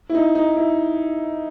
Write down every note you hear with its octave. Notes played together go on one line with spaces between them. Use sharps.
E4
D#4
D#4
E4